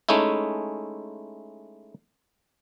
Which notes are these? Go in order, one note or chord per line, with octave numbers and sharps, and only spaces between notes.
G#3 A3 C#4 D#4 E4